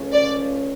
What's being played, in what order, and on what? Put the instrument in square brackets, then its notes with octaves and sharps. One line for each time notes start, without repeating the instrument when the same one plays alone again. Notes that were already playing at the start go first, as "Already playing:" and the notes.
Already playing: [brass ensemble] C#2 C#3 F3 A3 C#4
[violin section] D5